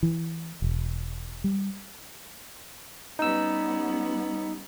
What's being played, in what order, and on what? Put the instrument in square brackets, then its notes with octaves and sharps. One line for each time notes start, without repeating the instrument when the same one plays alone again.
[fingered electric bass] E3
E1
G3
[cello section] G3 B3 C#4 [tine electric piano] D#4 E6